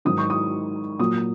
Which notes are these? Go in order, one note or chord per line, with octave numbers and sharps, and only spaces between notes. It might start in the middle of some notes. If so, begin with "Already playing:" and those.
G#2 D#3 F#3 D#6
C#6
D#6
A#2 F#3 D#6